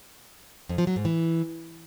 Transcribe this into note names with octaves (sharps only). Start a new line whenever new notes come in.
F2
F3
F#3
G#2
E3